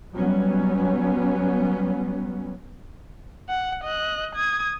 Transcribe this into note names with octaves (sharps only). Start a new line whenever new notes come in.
F#3 G3 B3 C#4
F#5
D#5 F#6
D#6 G#6